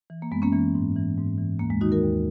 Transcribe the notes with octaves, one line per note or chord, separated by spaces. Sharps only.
E3
A#3
F#2 G#3 B3
A#3 C#4
E3 A#3
G#2
E3
G#2
E3
D#2 A#3
G#3
D#3 D#4 F#4
F#4 A#4
D#2